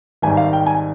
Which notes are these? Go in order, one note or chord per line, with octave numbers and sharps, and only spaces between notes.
G#1 G#2 D#3 G3 G#5
F5
G5
G#5